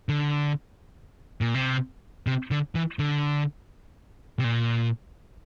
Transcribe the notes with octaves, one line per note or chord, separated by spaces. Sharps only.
D3
A#2
C3
C3
D3
E3
D3
C3
A#2